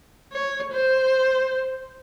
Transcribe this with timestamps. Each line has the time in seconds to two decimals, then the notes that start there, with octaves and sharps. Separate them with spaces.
0.32 C#5
0.72 C5